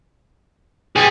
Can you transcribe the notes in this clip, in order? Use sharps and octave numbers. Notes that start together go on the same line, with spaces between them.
B1 G3 G#4